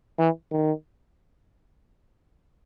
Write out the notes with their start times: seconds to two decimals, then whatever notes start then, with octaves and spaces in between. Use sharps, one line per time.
0.18 E3
0.52 D#3